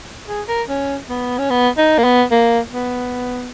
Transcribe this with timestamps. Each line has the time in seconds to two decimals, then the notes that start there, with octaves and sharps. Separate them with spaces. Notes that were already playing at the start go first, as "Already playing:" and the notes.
0.28 G#4
0.48 A#4
0.68 C#4
1.09 B3
1.39 C#4
1.50 B3
1.78 D#4
1.98 A#3
2.04 B3
2.31 A#3
2.72 B3